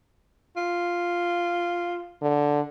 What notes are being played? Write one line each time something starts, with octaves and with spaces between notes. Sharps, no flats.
F4
D3